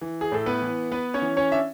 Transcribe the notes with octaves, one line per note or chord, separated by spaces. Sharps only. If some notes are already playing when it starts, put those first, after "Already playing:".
E3
G#4
A2 A4
B3 B4
E3
B3 B4
C#4 C#5
E3
C#4 C#5
D4 E5